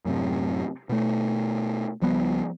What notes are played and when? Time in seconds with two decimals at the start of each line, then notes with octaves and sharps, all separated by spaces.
0.05 F#2 A2 C3
0.89 B2 A3
2.02 C#2 F3 G3 B3